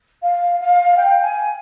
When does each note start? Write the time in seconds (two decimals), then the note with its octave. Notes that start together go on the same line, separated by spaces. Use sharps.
0.22 F5
0.60 F5
0.96 G5
1.21 G#5